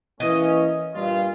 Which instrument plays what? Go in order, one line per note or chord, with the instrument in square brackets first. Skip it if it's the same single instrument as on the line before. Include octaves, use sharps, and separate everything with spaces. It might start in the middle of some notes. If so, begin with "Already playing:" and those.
[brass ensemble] E3 A#3 C#4 [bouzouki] D#5
[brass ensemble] G2 A#2 F4